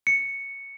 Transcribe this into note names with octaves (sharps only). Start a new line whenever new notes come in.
C#7